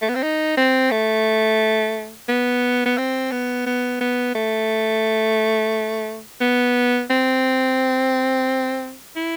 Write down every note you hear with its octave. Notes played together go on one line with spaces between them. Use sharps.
A3
B3
C4
D#4
C4
A3
B3
B3
C4
B3
B3
B3
A3
B3
C4
E4